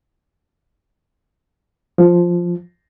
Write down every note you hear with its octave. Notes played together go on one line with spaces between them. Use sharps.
F3